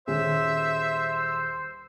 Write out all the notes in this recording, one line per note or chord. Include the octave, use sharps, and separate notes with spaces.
D#1 C#4 G#4 C5 E5 E6